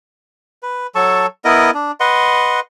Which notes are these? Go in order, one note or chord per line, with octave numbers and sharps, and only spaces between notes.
B4
F#3 A4 A5 C#6
B3 E4 A#4 D#5
D4
B4 D#5 F#5 C6